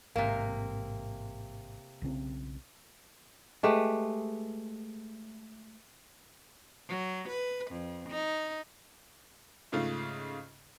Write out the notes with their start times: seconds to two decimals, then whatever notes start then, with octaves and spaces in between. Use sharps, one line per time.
0.16 A1 G#2 C3 A#3
2.02 B1 C#3 C4
3.63 G#3 A3 G4 B4
6.89 F#3
7.29 B4
7.71 F2
8.09 D#4
9.72 G#2 C#3 A3 F4